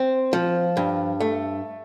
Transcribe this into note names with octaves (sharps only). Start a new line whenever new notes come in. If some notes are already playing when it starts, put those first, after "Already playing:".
Already playing: C4
F3
G2
A3